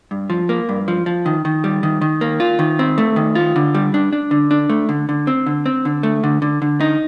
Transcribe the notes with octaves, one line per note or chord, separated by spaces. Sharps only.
G2
F3
A#3
G2
F3
F3
D#3
D#3
G3
D#3
D#3
A#3
F4
D#3
C4
A3
D#3
F4
D3
G3
D4
D4
D3
D4
A3
D3
D3
C4
D3
C4
D3
A3
D3
D3
D3
D#4